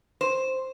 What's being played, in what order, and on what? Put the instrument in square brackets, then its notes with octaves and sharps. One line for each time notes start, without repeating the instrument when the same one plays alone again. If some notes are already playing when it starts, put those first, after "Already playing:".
[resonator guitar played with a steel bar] C5